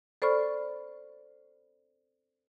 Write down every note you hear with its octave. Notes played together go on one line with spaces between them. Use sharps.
A4 C5 D5 B5 C#6 F6